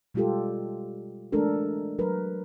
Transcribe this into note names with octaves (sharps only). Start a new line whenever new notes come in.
B2 G3 G#3 F4 G4 A4
E3 G#3 A3 D4 A4 A#4
F#3 A#4 B4